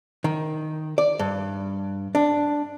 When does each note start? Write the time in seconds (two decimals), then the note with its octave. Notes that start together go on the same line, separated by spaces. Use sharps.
0.24 D#3
0.98 D5
1.19 G2
2.15 D4